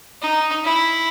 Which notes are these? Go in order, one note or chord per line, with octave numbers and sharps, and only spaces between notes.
D#4
E4